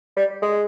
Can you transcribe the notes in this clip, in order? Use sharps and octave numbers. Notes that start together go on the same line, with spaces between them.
G3
G#3